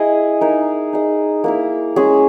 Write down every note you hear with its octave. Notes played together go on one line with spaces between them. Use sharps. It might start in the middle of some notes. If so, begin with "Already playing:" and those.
Already playing: E4 G#4 D#5
D#4 A#4 E5
D#4 G#4 D#5
A#3 E4 A#4
G#3 C#4 G#4